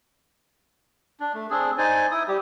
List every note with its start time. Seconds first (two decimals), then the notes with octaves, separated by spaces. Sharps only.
1.20 D4
1.34 A3
1.50 C4 D4 G#4
1.78 D#4 C5 D5 G#5
2.11 E4 D#6
2.28 G3 G4